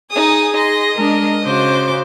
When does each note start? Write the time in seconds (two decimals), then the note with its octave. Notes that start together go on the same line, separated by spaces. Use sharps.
0.11 D#4 G#4 G#5 D#6
0.56 D#5 C6 A#6
0.97 G#3 D4 A#4
1.45 C#3 F#4 C5 D6